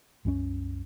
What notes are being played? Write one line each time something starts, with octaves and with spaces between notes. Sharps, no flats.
C2 F#2 C4 C#4